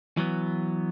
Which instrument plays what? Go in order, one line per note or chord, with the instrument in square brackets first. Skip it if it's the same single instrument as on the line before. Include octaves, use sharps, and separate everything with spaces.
[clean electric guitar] E3 F#3 B3